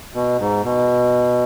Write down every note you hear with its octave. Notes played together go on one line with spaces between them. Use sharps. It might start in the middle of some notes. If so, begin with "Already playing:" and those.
B2
G#2
B2